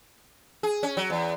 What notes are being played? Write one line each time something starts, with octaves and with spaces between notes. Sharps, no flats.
G#4
C#4
F#3
E2